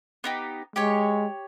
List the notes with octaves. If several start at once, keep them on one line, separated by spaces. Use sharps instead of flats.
B3 D#4 G4
G#3 G4 C#5 C#6